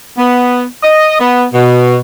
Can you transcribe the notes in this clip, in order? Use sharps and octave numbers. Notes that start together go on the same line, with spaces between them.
B3
D#5
B3
B2